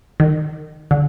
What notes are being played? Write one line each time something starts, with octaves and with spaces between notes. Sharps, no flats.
D#3
D3